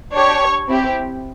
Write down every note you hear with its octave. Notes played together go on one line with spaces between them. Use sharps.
D4 G4 C#5
C4 E4 G4